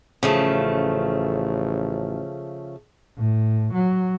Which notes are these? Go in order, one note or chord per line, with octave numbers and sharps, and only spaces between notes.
A1 C#3 F3 A3
A2
F#3